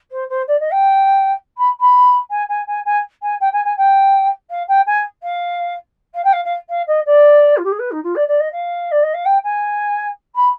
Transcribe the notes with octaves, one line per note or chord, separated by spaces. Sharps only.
C5
C5
D5
D#5
G5
B5
B5
G#5
G#5
G#5
G#5
G#5
G5
G#5
G#5
G5
F5
G5
G#5
F5
F5
G5
F5
F5
F5
D#5
D5
F4
G4
G#4
B4
D#4
F4
D5
D5
D#5
F5
D5
D#5
F5
G5
G#5
B5